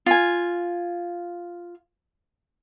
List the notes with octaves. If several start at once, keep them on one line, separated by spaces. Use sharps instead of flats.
F4 G#5